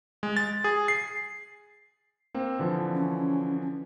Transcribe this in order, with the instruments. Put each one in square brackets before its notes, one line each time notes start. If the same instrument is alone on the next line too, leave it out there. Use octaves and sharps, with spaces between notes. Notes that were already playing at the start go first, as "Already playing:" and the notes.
[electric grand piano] G#3
A6
G#4
C7
A#3 C4
D3 E3 F3
[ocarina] C#4